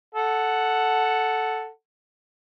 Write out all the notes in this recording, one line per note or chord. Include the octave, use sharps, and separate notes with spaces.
A4 F#5